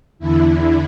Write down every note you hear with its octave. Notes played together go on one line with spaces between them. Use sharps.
E2 D3 E4